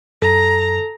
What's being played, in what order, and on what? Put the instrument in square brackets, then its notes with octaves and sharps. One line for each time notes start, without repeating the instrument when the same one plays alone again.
[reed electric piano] F#2 [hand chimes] A4 [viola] A#5